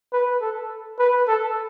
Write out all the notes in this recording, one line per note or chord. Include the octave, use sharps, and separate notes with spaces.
B4
A4
B4
A4